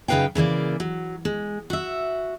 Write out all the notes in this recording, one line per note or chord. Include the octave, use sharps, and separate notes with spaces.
F#2 C#3 D#4 B4 F5 G5
C#3 E3 A#3 D5
F#3
G#3
F#4 E5